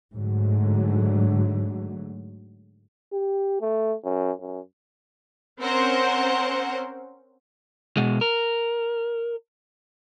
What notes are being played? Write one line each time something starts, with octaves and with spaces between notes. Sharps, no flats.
G#2 D3 F#3 A3
G4
A3
F#2
F#2
C4 C#4 A#4 C5 F#5
B2 G#3
A#4